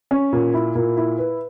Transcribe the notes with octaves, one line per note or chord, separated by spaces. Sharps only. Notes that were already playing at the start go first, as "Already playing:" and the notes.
C#4
A#2
E4
A#2
E4
B4